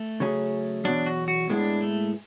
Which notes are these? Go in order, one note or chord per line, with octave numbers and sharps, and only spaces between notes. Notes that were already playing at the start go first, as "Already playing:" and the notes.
Already playing: A3
C#3 F#3 C#4 G#4
E2 B2 F#3 D4
F#4
F#4
A2 G#3 B3 D4 E4 G#4
A3